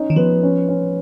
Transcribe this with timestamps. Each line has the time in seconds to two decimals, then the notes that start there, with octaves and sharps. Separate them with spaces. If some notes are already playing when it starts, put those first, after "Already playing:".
Already playing: C#4 D#4
0.10 D#3
0.16 F3 B3
0.43 C#4
0.69 C#4